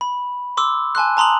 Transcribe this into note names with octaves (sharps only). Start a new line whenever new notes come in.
B5
C6 D6 E6
G#5 A5 C6 F#6
A5 A#5 C6 D#6 F#7